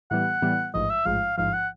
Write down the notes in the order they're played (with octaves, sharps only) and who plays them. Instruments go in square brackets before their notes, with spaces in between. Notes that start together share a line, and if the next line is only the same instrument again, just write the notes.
[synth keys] A2 E3 G3 B3 [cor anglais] F#5
[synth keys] A2 E3 G3 B3
[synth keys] A1 G#2 F3 [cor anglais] D#5
[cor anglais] E5
[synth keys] A1 G#2 F3 [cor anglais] F5
[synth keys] A1 G#2 F3 [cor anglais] F5
[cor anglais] F#5